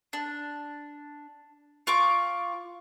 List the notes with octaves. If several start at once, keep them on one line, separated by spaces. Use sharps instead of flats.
D4
F4 C#6 D6